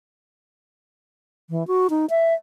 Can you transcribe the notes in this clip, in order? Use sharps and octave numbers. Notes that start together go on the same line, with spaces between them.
E3
F#4
D#4
E5